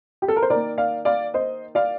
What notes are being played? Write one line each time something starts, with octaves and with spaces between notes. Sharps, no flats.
G4
A4
A#4
C5
D#3 A#3 A#4 D5
D5 F5
D5 F5
C5 D#5
D5 F5